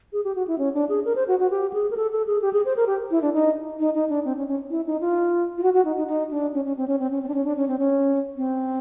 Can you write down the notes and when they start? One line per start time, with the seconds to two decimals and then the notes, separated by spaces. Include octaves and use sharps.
0.13 G#4
0.24 G4
0.36 F#4
0.48 E4
0.58 C#4
0.74 D4
0.89 G#4
1.05 A#4
1.16 C5
1.28 F#4
1.39 F#4
1.51 G4
1.73 G#4
1.91 A#4
1.97 A4
2.12 A4
2.27 G#4
2.42 G4
2.53 G#4
2.65 C5
2.76 A#4
2.87 G4
3.11 E4
3.22 D4
3.34 D#4
3.79 D#4
3.94 D#4
4.09 D4
4.25 C4
4.37 C#4
4.48 C#4
4.70 E4
4.87 D#4
5.01 F4
5.58 F4
5.63 F#4
5.74 F#4
5.85 D#4
5.96 D#4
6.07 D#4
6.31 D4
6.54 C#4
6.65 C#4
6.77 C4
6.88 C#4
6.99 C4
7.11 C#4
7.23 C4
7.28 D4
7.34 C#4
7.45 D4
7.57 C#4
7.68 C4
7.79 C#4
8.37 C4